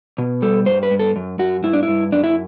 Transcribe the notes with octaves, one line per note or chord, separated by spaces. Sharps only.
B2
G3 A4
G2 C5
B4
G2
A4
F#2
F#2 F#4
G2 E4
D4
E4
G2
F#2 D4
E4